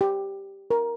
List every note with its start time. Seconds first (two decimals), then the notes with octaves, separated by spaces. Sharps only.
0.01 G4
0.70 A#4